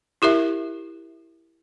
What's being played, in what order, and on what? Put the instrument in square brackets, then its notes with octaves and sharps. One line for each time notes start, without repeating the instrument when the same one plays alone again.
[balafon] E4 G4 A#4 E5